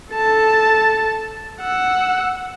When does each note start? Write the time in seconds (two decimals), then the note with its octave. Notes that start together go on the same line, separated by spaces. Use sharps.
0.13 A4 A5
1.61 F#5 E6